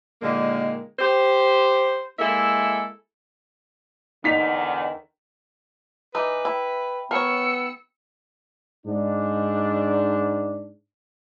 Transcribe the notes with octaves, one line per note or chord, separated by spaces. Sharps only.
A#2 D3 D#3 G#3 A#3
G4 C5
G#3 A#3 E4 A4 E5
E2 D3 D#3 D#4 B6 F7
E3 D#4 B4 A#5 B5 D6
E4 E5 G5 B5
B3 A#4 C#5 E6 C#7
G#2 D4